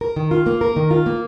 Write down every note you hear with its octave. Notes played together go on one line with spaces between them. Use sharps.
A#4
D#3
F4
A#3
A#4
D#3
F4
A#3